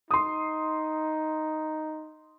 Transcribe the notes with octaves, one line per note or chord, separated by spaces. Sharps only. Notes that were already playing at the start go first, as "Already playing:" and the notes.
D#4 C6 D#6